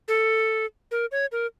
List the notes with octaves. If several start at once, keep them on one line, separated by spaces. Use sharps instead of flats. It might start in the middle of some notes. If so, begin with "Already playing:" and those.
A4
A#4
C#5
A#4